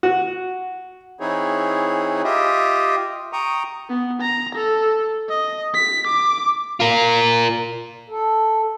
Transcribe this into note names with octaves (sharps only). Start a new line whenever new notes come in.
F#4
E3 C4 D#4 E4 G#4 C#5
F4 G4 D#5 E5
G5 A#5 C#6 D#6
B3
A#5
A4
D#5
B6
D6
F4 A#4
A4